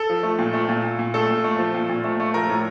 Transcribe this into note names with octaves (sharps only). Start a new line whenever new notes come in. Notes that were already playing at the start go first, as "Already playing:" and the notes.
Already playing: A4
F3
A3
A#2
A3
A#2
A#2
A#2
A3 A4
A#2
A3
F3
A#2
A#2
A3
A3
F3 A#4
A2